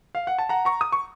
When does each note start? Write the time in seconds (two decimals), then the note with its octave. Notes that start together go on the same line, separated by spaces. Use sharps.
0.15 F5
0.27 F#5
0.39 A5
0.49 F#5 A#5
0.65 A#5 C#6
0.81 D#6
0.92 C#6